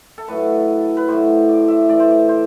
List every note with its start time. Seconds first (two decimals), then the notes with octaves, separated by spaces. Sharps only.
0.18 A4
0.28 A2 F#3 B4
0.97 B4
1.08 A2 F#3 C5
1.49 D5
1.68 E5
1.88 A2 E3 D5
2.00 C5
2.11 D5
2.29 C5